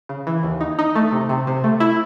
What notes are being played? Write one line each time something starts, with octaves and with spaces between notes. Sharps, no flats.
C#3
E3
D#2
D#4
D#4
A3
C3
C3
C3
A3
E4